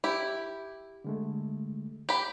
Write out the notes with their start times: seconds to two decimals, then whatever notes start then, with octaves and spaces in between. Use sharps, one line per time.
0.04 E4 G4
1.04 D3 G#3 A3
2.09 G4 B5